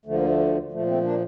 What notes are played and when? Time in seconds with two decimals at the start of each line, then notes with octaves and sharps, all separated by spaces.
0.05 D2 D3 F3 A3
0.15 A#3
0.24 A3
0.71 A#2 F3 A3
0.87 A3 C4
1.03 A#3 D4